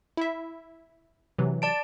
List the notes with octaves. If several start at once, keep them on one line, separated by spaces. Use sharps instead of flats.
E4 E5
C3 E3 F#3
D5 A5 D7